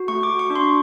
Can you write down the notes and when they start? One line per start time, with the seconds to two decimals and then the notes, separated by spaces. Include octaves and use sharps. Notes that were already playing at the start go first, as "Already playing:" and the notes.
Already playing: F#4
0.08 A3 C#6
0.23 D6
0.30 F#4
0.39 C#6
0.50 D4
0.55 C6